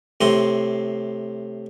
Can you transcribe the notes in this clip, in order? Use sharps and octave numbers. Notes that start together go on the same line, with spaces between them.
A2 C3 C6